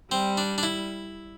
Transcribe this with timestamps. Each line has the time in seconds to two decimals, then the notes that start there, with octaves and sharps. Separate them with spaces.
0.11 G3 C4
0.37 D4
0.58 D4
0.63 E4